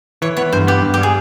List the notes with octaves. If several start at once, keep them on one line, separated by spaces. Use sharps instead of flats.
E3 C#5
B3 C#5
G2 C5
B3 G4
G2
G3 G4
G#4